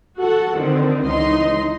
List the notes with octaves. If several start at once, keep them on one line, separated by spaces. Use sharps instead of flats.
F#4 A4 F#5
D3 D#3 C4
C#2 E3 D#4 D#5 C6